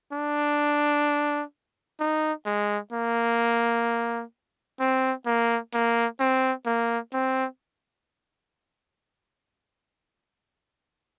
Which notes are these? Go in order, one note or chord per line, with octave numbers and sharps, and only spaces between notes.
D4
D#4
G#3
A#3
C4
A#3
A#3
C4
A#3
C4